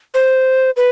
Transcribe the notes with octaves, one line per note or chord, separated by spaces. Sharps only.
C5
B4